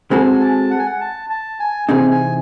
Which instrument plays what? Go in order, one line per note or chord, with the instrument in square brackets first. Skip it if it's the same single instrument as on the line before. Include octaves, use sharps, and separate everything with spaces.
[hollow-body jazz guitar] G#3 C4 F#4 A4 [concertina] G#5
[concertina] A5
F#5
G#5
F#5
A5
A5
G#5
[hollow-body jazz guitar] C3 E3 C4 D#4 G#4 [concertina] G#5
[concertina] G#5